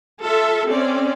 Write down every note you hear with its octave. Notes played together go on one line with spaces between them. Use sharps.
F4 A4 E5
C4 C#4 D5